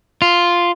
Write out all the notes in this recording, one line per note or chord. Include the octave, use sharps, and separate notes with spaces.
F4